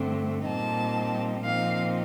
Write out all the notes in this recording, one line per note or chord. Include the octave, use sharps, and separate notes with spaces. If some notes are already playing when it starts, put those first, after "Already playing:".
Already playing: G2 D3 A3 C4
A#2 G3 C4 D#4 A5
A#2 F3 C4 D#4 F5